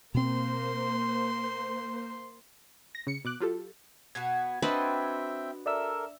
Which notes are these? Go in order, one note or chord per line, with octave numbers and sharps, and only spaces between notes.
B2 A#3 C4 C5 C6
A#6
C#3 C#7
B2 D6 F#6
F#3 F4 G4 A4
B2 B3 F#4 G#6
C4 D4 F#4 B4 C5 D#5 E5 G5
A4 A#4 D5 E5 E6